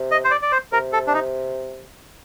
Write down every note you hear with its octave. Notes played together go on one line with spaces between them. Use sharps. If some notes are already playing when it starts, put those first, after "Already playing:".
Already playing: C3
D#5
C5
D5
D5
C5
C3 A#4
A4
D4
D#4